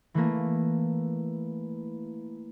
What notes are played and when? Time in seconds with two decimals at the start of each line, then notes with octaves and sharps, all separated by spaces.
0.14 E3 A3 A#3 A#4